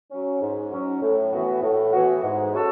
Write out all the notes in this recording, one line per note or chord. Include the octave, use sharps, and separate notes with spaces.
F#3 C#4
G#2
F#3 C#4
A2
E3 B3 F#4
A2
E3 B3 F#4
G#2
G#3 C#4 F#4 A4